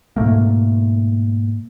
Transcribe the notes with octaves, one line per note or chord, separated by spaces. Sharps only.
G#2 B2 A3 A#3